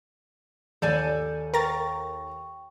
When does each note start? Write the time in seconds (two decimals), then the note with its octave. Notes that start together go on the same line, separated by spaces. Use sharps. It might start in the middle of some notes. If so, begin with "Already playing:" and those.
0.82 D#2 A4 D5 G#5 G6
1.54 A#4 G5 A#5 C#6 A6